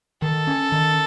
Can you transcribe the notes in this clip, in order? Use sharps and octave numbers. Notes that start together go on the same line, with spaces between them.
D#3 A4
C#4
D#3